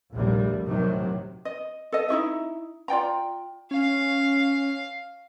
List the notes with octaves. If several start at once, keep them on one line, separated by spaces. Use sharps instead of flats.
A#1 D#2 C3 G3 A3
A2 C3 D#3 F#3
D#5
A4 D#5
D#4 E4 F#4 E5
F4 D5 G5 A#5
C#4 F5